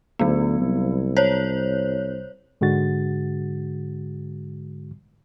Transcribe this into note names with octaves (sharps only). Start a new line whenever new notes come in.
D2 F#3 B3
C2
C5 C#5
G#2 D3 G#3 F#4 A6